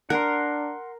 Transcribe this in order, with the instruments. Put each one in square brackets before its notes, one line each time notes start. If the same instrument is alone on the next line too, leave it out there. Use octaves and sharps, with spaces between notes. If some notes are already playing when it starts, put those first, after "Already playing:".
[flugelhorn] D4 [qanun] A#4 [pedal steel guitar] F#5 C6